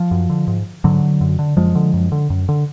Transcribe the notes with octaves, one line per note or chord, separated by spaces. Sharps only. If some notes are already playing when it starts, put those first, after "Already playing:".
Already playing: F3
F#2
D3
G#2
G#2 D3 F#3
F#2
D3
F#2 F3 G#3
D3
F#2
D3
F#2
D3